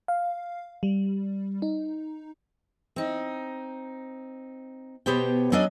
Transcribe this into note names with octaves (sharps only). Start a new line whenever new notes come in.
F5
G3
D#4
C4 D#4
B2 B3 G4 C5 C#5 G5
F#3 C#4 D4 A4 D5 D#5